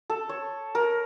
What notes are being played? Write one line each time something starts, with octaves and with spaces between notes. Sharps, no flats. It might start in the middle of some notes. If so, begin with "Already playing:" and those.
A4
C#5
A#4